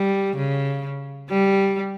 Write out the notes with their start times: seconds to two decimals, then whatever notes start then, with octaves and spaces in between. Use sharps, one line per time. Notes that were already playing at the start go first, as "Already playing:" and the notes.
Already playing: G3
0.36 C#3
1.30 G3